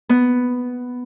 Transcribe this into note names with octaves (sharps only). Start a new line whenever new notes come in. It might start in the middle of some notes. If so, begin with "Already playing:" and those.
B3